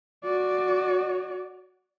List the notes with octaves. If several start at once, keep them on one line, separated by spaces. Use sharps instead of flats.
F#4 D5